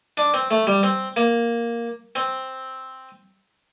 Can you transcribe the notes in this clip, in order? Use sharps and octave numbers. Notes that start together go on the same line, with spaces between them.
D4
C4
A3
G3
C4
A#3
C4